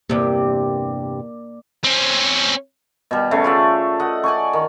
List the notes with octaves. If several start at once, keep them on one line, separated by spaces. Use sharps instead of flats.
E2 G2 C3 A#3 D5
C4 C#4
B2 G3
C#3 A3
F4 D5 E5
D#5 F#5
D5 G#5 C#6
D#3